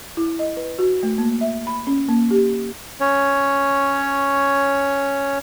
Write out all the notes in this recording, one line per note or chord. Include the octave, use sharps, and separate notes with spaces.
E4
D#5
B4
F#4
A3
A#3
E5
B5
C#4
A#3
G4
C#4 C#5